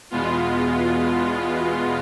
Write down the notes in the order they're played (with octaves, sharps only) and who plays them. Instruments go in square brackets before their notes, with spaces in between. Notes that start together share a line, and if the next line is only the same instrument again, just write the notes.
[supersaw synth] E2 B2 G#3 B3 F4